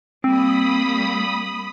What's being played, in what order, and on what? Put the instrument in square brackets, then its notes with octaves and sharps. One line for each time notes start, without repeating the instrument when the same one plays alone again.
[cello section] G3 A#3 [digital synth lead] C4 [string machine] B5 D#6